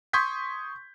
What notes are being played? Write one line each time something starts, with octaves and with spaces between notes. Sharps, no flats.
C6 C#6 D#6 G6 G#6 B6